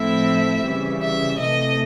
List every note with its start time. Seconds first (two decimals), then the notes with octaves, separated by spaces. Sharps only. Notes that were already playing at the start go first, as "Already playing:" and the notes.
Already playing: A2 F3 A3 C4 E4 E5
0.66 C#3 E3 G3
1.03 E5
1.40 C3 E3 A3 D#5